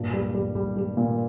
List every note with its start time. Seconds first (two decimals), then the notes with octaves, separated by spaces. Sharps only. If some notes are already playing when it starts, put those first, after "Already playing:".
Already playing: G2 A#2
0.13 G3
0.35 G3
0.55 G3
0.76 G3
0.97 A#2